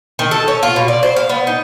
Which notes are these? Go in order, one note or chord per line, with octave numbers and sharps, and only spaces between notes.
D#3
A4
C#4
F4
B2
D5
C5
F5
B3
D#4